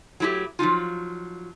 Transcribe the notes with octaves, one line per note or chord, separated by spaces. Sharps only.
F#3 A3 E4 F#4 G4
F3 F#3 D#4 F4